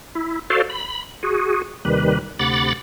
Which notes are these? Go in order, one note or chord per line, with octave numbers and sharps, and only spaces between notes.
E4
F#4 A4 C5 D5 F5
B5
F#4 G#4
D#2 C3 D#3 G3 B4
D2 C3 F#5 B5 D6 A6